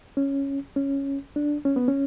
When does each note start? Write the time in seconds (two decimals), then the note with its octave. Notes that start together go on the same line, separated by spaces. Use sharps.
0.17 C#4
0.76 C#4
1.36 D4
1.65 C#4
1.76 B3
1.88 C#4